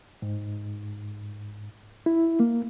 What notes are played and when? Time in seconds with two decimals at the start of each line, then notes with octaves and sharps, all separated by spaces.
0.22 G#2
2.06 E4
2.40 A#3